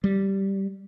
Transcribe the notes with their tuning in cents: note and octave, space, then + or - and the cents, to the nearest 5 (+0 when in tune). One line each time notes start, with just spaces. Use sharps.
G3 -5